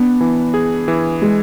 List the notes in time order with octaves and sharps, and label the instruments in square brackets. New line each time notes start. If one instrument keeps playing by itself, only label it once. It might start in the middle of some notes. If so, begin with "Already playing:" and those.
Already playing: [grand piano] B3 [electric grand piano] D4
[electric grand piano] E3
G#4
E3
[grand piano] G#3